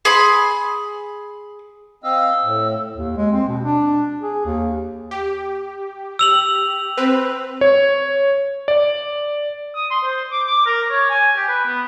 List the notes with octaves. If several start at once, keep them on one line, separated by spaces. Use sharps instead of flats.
G#4 B5 C6
C4 D#5 F5 E6
A2
D#2
G#3
C4
B2
D4
G#4
D#2
G4
E6 F7 F#7
C4 B4
C#5
D5
D#6
C6
C5
D6
D6
A#4
C#5
G#5
G4
B4
B3